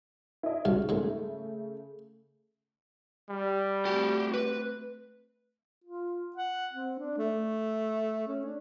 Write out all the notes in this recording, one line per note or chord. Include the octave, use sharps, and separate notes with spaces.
E4 D#5
C2 G#2 C#3 F#4 F5
G#2 C#3 G#3 A3
G3
A3 C4 F#4 G4
B4
F4
F#5
C4
D4
A3
C#4
D4